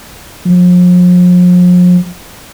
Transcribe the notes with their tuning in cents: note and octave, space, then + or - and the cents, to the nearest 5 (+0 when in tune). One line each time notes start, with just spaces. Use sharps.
F3 +40